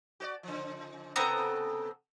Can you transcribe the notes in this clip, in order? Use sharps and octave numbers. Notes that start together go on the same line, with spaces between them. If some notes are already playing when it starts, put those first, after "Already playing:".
F#4 C5 D5
C#3 F3
A2 C3 B3 C4 A4 A#5